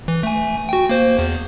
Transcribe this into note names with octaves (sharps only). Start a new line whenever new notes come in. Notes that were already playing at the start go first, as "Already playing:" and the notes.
E3
A3 G#5
F#4 G5
A#3 C5
E2